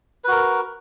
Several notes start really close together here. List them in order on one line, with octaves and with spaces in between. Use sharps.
B4 F#4 A#4